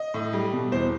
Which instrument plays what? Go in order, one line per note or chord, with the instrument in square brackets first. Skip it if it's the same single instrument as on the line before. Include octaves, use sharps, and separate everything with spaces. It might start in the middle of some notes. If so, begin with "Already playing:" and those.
Already playing: [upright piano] D#5
A2
G3
B2
E2 C5